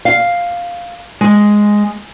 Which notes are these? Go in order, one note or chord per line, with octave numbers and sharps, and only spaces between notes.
F5
G#3